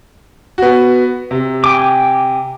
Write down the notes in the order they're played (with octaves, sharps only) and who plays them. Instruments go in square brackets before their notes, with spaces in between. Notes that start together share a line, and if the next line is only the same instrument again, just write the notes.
[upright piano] B3 F#4
C3
[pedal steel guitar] G5 G#5 D6